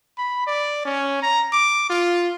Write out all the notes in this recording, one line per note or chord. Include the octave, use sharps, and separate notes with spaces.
B5
D5
C#4
A#5
D6
F4